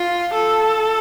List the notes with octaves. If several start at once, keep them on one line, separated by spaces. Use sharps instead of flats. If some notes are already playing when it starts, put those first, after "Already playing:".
Already playing: F4
A4